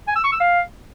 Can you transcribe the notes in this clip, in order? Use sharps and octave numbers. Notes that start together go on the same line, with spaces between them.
G#5
E6
C#6
E6
F5